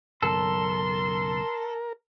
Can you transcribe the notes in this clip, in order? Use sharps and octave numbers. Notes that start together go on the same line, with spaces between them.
F#1 B1 F#2 A4 A#4 C6